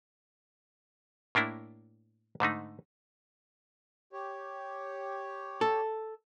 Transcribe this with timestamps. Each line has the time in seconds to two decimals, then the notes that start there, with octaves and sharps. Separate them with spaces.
1.35 A2 A#3 D4 E4
2.40 G#2 D3 A3 D#4
4.13 G4 C#5
5.61 A4